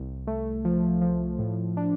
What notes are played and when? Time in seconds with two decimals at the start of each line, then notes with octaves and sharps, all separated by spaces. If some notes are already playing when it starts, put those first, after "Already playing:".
Already playing: C2
0.27 A3
0.65 F3
1.01 F3
1.39 A2
1.77 D4